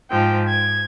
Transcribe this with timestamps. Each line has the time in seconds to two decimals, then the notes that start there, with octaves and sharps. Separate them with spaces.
0.10 G#2 F3 G5
0.47 G#6